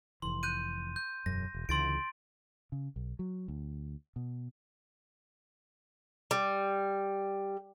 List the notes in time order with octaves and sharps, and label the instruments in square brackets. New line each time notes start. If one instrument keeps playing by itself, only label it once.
[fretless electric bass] F1 E3 [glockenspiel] C6
[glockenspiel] F#6 G6 D#7
G6
[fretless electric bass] E1 F#2 [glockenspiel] A#6
[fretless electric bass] E1
[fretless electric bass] C#2 D3 E3 [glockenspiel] C6 A6 D7
[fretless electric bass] C#3
B1
F#3
D2
B2
[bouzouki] G3